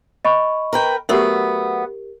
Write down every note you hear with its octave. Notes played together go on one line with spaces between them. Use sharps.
D#5 B5 C#6
A#4 B4 G5
F#3 A3 B3 G4 A#4